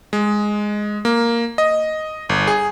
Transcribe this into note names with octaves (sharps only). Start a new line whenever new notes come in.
G#3
A#3
D#5
G1
G#4